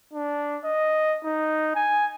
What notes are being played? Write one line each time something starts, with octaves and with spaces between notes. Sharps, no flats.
D4
D#5
D#4
G#5